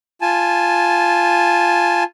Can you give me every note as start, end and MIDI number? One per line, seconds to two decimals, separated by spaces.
0.21 2.04 65
0.21 2.04 80
0.21 2.04 81